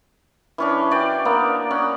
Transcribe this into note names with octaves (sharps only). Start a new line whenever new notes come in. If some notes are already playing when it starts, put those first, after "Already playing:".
E3 C#4 D4
F#4 D5 G5
A#3 B3 D5
C#4 F#5